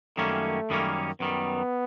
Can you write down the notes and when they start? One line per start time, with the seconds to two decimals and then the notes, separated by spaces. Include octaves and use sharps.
0.17 F#2 D#3 G3 A3 A#3 C#4
0.70 F#2 D#3 G3 A#3 C#4
1.20 F#2 D#3 G3 B3